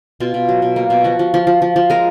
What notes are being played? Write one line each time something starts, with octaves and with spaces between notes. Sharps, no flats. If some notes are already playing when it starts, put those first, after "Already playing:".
B2 F4
B2
F#3
B2
A#3
B2
F3 F#4
F3
F3
F3
F3
F3
G#3 A#4